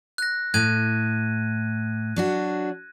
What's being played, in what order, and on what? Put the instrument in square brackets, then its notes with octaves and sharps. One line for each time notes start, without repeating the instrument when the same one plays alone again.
[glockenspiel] F#6 A#6
[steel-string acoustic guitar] A2 [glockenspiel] F#6 G#6 D#7
[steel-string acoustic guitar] F#3 D4 F#4